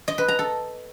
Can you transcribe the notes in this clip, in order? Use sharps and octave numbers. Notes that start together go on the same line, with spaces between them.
D#5
B4
A#5
A4